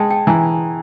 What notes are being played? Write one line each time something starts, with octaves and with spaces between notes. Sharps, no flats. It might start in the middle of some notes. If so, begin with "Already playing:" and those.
Already playing: G#3 G5 A5
G5 A5
E3 G#5 A#5